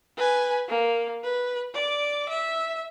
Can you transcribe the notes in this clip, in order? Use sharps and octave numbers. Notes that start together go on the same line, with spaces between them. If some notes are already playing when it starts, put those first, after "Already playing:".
B4 G#5
A#3
B4
D5 D6
E5